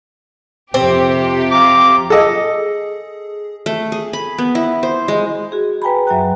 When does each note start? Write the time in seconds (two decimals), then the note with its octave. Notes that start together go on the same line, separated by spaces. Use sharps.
0.74 F2 C3 C4 G4
1.52 F4 A#5 D6
2.10 G#4 A4 D#5
3.66 A3
3.92 G#4
4.13 B5
4.38 B3
4.55 E4
4.83 C5
5.08 G#3
5.52 F#4 G#4
5.82 B4 G5 G#5 A#5 B5
6.07 F#2 F#3 E5 G5 A#5 F#6